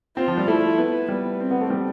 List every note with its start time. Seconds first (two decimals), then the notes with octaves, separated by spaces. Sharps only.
0.17 C4 F4
0.28 F3
0.38 G3
0.48 A3 E4
0.78 B3
1.09 G3 B3
1.40 C4
1.51 B3
1.61 A3
1.70 G3